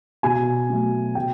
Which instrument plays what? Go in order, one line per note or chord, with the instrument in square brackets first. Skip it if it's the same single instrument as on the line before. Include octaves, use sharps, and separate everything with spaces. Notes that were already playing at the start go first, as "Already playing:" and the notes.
[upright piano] B2 G#5
F#3 A3
B2 G5